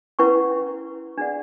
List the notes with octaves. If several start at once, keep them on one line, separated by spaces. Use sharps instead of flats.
C#4 E4 B4 F#5 C#6
D4 G#4 D5 F#5